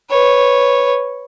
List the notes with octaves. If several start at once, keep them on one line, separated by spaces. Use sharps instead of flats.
B4 C#5